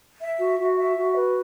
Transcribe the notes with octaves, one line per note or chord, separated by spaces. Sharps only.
E5
F#4
F#4
E5
F#4
B4